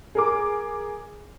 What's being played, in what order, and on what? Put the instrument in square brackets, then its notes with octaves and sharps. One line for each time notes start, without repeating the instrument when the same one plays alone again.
[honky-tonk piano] G#4 A#4 D6